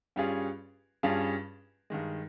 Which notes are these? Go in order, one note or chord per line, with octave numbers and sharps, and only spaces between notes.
G2 G3 C#4 F4 G#4
G2 G3 C#4 F4 G#4
G2 D#3 G#3